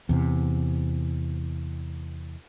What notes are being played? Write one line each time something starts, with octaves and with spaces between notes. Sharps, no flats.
E2 C3